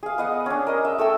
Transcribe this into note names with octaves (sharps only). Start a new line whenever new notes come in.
G#4 F5
B3 D#5 F#5
C#4 D4
A#4 D#5
E5
A3 A4 G5 E6